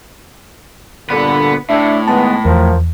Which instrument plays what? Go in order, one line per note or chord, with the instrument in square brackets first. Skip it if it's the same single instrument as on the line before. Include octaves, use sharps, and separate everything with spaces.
[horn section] G2 A#2 D3 [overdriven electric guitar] B3 B4
[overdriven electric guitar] A2 [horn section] D4 E5
[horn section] D#3 G#3 B3 [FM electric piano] A5
[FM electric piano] E2 [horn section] F3 A#4